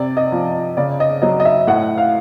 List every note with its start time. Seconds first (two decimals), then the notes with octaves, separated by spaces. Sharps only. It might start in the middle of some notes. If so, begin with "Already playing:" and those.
Already playing: C3 D5
0.17 D#5
0.32 F3
0.77 C#3 D5
1.00 D#5
1.22 F#3 D#5
1.40 D#5
1.45 E5
1.67 A2 F#5
1.98 F5